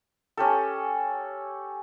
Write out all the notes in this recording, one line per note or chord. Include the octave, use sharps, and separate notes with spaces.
C#4 G4 A4